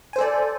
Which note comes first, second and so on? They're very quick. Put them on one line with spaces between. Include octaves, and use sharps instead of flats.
G#5 C5 A4 D5